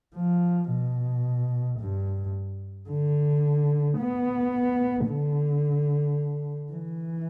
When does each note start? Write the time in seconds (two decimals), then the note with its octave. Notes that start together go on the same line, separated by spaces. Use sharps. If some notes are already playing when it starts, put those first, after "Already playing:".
0.16 F3
0.70 B2
1.80 G2
2.90 D3
3.98 B3
5.08 D3
6.72 E3